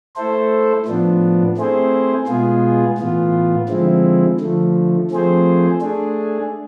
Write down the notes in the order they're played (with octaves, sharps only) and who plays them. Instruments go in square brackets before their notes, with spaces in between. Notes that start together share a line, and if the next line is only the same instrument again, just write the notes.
[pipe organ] A3 E4 A4 C5
A2 F3 B3 D4
A3 C4 E4 G#4 C5
B2 G#3 B3 F4 G#4
A2 E3 B3 F4
D3 F3 G#3 C4 E4
D3 F3 A3
F3 A3 C4 G#4 C5
A3 D4 G#4